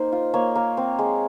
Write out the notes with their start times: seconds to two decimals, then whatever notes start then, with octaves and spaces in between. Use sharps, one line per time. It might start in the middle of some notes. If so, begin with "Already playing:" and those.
Already playing: A#3 D#4 C5
0.12 F4
0.34 A#3 C#5
0.56 A#3
0.77 C4
0.99 G#3